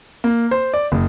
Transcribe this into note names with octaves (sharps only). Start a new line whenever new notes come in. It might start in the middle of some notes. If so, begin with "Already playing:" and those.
A#3
C5
D5
F#1